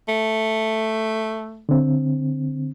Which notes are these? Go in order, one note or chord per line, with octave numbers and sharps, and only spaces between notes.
A3
D3 C4